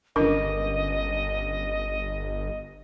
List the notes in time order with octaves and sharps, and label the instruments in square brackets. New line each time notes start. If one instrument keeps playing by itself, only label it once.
[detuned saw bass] G1 [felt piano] C#2 D3 D6 [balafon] D4 A#4 [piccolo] D#5